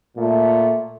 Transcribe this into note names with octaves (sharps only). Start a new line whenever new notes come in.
A#2 A3